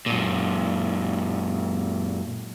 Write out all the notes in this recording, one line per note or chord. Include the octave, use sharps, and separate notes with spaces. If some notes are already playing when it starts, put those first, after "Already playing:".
F#2 A#2